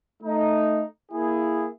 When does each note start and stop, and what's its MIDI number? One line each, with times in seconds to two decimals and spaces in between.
0.23 0.83 57
0.23 0.83 63
1.11 1.67 58
1.11 1.67 64
1.11 1.67 68